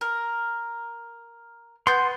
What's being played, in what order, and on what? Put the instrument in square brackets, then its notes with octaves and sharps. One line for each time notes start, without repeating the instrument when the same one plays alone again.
[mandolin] A#4
[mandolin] B3 G6 [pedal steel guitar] C6